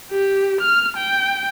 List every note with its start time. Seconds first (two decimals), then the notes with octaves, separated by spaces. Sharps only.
0.11 G4
0.61 F6
0.97 G5